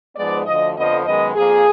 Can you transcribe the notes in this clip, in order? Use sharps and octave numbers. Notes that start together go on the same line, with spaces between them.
G#2 F3 G#3 B3 D5
D2 D3 F3 D#5
F2 D3 F3 B3 D#5
F#2 D#3 G#3 B3 D#5
F2 F3 A#3 G#4